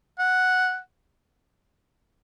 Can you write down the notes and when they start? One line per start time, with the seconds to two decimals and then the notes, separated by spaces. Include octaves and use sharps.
0.19 F#5